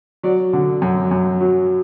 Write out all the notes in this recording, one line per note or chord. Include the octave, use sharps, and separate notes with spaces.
F#3 D5
D3
F#2
F#2
F#3